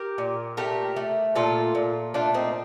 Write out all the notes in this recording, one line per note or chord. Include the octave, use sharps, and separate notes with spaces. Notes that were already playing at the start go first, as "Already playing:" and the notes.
Already playing: G4 A#4
A#2
A3 G4 A#4
A3
A#2 F4 A4
A#2
A3 D4 F4
C4 D#4